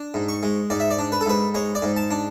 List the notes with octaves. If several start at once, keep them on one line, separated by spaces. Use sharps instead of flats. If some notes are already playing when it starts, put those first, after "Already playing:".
Already playing: D4
G#2
C#6
G#3
G#2 D5
E5
D5
D4
B4
A4
G#2 B4
G#3 C#5
D5
G#2
A5
D4